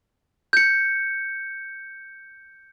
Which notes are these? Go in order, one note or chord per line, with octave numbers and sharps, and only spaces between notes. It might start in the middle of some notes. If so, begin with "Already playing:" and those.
G6 C#7